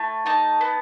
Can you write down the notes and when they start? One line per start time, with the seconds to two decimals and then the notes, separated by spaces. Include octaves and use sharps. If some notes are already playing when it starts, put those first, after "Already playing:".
Already playing: A3 E4
0.26 D#4 A5
0.61 B3